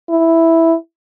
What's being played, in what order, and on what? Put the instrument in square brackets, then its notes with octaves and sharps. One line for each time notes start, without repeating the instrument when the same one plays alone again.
[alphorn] E4